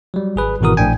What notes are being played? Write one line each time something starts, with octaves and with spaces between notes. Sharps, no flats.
F#3 G3
G#1 G#4 B4
G#1 B2 E3 F#4 A#4 D#6
A#1 A2 D4 G5 G#5